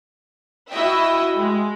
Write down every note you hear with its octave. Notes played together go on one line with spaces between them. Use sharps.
E4 F#4 D#5 E5 G5
G#3